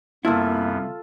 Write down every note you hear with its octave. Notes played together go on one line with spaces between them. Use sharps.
C2 F#2 A#3 B3 E4 F4 A4